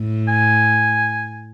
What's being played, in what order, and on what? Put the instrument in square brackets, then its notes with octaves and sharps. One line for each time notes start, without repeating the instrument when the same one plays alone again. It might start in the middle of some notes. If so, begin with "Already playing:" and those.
Already playing: [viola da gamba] A2
[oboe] G#5